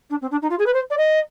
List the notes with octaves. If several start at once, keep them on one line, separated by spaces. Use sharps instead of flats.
D4
C4
D4
D#4
F4
G#4
B4
C5
D5
D#5